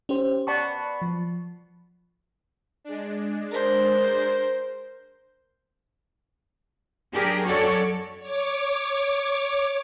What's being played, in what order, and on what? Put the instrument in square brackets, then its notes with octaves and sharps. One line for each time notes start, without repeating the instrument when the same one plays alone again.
[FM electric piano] C#4 G4 C5
[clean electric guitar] B3 F#4 [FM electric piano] D5 A5 C#6
[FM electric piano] F3
[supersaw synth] G#3 D4
[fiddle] A#4 C5
[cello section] F#3 D4 G4 G#4 A#4
F#2 C#4 F#4 A4 C#5 D5
[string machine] C#5 D6